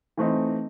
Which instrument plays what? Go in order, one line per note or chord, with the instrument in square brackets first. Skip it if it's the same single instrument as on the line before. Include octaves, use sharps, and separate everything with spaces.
[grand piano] E3 A3 C4 D#4